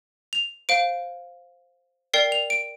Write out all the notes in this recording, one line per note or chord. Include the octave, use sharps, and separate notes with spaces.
F7
C5 F5 D7
A#4 D5 G5 C7
F7
D7